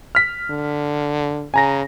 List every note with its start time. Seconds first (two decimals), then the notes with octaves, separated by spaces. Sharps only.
0.15 F6 B6
0.50 D3
1.54 C#3 G#5 A#5 A#6